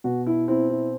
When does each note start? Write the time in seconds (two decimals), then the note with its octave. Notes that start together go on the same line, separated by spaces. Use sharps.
0.04 B2 F#4
0.26 E4
0.48 C4 E4
0.70 E4